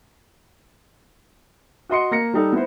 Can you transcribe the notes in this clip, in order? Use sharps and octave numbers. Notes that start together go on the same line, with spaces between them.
F#4 D#5 C6 C#7
A#3 A#6 C#7
G3 D#4 A4
B3 E4 C5